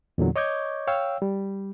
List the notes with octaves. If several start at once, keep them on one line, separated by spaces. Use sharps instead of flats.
E2 A#2 D3 F#3
C#5 D#5 C#6 D6 G6 G#6
C#5 F5 G5 E6
G3